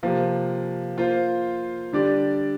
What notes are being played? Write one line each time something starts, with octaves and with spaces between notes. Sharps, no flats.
C3 F3 A#3
A#3 F4 C5
D3 G3 D4 G4 D5